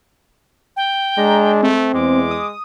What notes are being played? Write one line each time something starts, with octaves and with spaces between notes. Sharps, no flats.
G5
G#3 D4 A#5
A3 C4
E2 G#3 D6
D#6